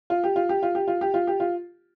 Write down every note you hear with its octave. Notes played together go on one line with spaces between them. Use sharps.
F4
G4
F4
G4
F4
G4
F4
G4
F4
G4
F4